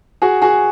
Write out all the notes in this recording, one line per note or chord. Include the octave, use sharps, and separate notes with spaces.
F#4 G#4
F#4 G#4